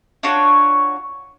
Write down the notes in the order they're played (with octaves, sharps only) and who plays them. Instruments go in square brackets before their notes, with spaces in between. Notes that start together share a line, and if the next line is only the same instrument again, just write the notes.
[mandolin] D4 F4 F#4 C#5